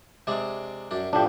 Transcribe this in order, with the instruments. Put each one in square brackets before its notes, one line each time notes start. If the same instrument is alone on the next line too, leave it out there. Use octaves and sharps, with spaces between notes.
[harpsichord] C3 G#3 D4
F#2 D4
[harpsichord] A2 F3 [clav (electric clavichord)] D4 G4